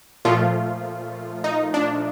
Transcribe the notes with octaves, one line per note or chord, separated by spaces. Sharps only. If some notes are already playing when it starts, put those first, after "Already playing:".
A#2 F3 A3 F4
D#4
D4